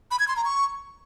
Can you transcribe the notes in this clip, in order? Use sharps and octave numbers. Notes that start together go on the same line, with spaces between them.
B5
G#6
C6
A#5
C#6